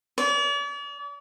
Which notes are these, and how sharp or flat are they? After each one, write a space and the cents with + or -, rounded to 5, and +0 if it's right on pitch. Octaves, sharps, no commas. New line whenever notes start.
D5 -45